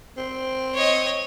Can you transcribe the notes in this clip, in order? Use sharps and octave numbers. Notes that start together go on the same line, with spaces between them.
C4
C#5 D#5